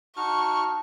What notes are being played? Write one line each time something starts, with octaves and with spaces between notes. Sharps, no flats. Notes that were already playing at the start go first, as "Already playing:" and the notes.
D#4 F#4 A5 C#6 F6